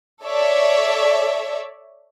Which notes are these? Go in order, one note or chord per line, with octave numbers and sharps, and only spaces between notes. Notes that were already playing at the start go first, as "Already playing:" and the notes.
A4 C#5 D5 E5